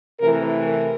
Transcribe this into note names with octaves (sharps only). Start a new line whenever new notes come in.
C3 E3 A3 A#4
A#4